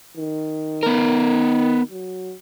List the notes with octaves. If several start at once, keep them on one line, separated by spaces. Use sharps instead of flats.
D#3
B3 A#4
F#3